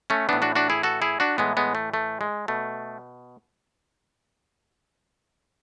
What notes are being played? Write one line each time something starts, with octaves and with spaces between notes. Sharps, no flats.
A3 C#4
A2 E3 B3 D4
D4 F#4
D4 F#4
E4 G#4
F#4 A4
E4 G#4
D4 F#4
A2 E3 G#3 B3
G#3 B3
A3
A3
G#3
B2 A3